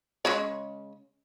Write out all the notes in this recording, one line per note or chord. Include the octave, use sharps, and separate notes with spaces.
C#3 G#3 C#5